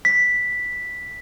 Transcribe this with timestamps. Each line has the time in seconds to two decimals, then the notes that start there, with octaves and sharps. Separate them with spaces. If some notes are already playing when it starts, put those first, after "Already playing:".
0.05 B6